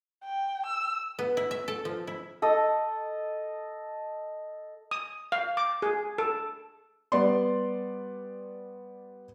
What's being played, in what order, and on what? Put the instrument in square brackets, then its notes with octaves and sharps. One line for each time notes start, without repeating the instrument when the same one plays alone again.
[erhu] G5
E6
[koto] B3
E4
E5
A4
F3
E4
[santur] A4 D#5
[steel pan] D#6
F5
D6
G#4
A4
[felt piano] G3 B3 D5 C6